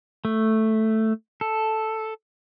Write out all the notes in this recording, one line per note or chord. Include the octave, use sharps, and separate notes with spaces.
A3
A4